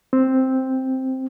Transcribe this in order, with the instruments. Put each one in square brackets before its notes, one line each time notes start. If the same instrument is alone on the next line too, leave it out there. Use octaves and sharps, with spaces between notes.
[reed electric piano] C4